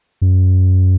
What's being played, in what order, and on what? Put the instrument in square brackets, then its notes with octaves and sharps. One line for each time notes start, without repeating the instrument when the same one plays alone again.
[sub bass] F#2